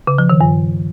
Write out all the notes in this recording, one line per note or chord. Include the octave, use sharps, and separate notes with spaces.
C#3
F3
D#3
G2